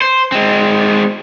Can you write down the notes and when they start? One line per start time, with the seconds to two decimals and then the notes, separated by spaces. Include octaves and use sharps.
0.02 C5
0.32 G#3 C4